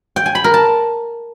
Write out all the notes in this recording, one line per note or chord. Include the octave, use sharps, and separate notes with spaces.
G5
G#5
B5
A#4
A5